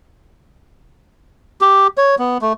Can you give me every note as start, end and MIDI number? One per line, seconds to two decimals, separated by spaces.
1.61 1.87 67
1.97 2.15 73
2.19 2.38 59
2.42 2.53 57